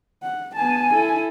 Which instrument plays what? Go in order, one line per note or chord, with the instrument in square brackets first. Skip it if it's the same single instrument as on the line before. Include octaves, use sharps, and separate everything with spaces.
[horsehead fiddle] F#5
[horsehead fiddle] B3 A5 [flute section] G#5
[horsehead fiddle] E4 A4